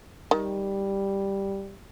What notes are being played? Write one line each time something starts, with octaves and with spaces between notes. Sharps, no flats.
D#3 G3